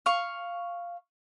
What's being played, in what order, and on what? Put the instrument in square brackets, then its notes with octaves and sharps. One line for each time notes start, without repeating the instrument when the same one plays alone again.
[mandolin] F5 C#6